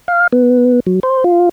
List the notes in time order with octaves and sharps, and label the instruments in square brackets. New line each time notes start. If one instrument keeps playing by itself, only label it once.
[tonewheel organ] F5
B3
F#3
C5
F4